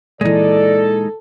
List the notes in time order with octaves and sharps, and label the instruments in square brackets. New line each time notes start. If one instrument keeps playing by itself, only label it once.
[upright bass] A#2 E3 [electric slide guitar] G#3 D#4 [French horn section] A4 [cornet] D5